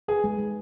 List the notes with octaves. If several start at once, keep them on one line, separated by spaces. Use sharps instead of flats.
G#4 B4
G#3
G#3